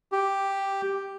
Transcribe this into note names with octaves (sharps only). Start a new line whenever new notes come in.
G4